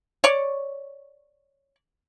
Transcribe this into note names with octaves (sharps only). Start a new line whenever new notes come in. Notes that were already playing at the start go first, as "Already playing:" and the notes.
C#5 D5